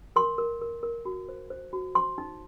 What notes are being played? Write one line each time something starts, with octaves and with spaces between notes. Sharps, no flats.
A#4 C6
A#4
A#4
A#4
F#4
C5
C5
F#4
C5 C6
D#4